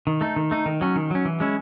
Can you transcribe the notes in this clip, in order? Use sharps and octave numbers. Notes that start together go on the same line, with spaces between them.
D#3
A3 D#4
D#3
A3 D#4
D#3
F#3 C#4
D#3
F#3 C#4
E3
G#3 C#4 E4